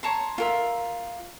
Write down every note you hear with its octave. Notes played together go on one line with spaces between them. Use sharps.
C#5 A5 A#5 C6
F4 A#4 E5